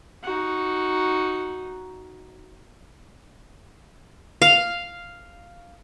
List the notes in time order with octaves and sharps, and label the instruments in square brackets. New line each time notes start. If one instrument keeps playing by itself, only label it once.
[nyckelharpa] D#4 F#4
[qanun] F5